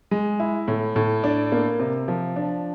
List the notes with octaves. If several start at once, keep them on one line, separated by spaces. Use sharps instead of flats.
G#3
E4
A2
A2
D4
A#3
C3
F3
D4